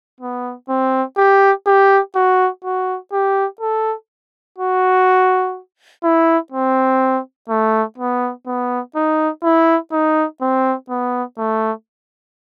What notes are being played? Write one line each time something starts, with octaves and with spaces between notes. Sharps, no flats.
B3
C4
G4
G4
F#4
F#4
G4
A4
F#4
E4
C4
A3
B3
B3
D#4
E4
D#4
C4
B3
A3